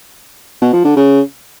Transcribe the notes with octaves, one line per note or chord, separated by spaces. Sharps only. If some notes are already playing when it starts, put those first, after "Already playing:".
B2
F3
D3
C#3